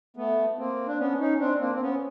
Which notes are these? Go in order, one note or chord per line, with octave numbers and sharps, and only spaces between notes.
A3 B3
A#3 C4
D4
B3 C#4
C#4 D#4
C4 D4
A#3 C4
C4
B3 C#4